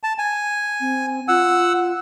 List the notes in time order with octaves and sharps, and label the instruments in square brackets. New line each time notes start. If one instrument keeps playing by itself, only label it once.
[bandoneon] A5
G#5
[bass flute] C4
[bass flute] F4 [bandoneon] F#5 E6